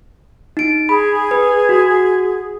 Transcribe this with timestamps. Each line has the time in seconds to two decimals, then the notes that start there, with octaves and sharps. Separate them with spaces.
0.57 D#4 D7
0.89 G#4 B5
1.31 B4
1.69 F#4